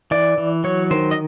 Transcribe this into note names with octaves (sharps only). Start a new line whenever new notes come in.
E3 D5
E3
F#3 C#5
D#3 C5
D#5